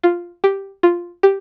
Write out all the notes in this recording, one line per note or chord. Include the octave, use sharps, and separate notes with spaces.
F4
G4
F4
G4